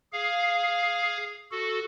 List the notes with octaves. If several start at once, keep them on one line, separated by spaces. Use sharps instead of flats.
G#4 F5
F#4 A4